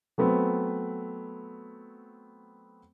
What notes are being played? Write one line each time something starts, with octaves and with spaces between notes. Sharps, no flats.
F#3 A3 B3 C4